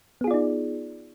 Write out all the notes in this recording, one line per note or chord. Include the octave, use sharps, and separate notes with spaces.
B3 D#4 F4 G#4 D5